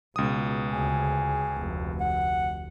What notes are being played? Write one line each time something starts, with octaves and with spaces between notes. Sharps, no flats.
C#2 B2 D#6
D2 C#3 G#4
F1 D2
F#5